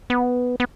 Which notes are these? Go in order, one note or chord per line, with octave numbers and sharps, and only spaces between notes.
B3
B3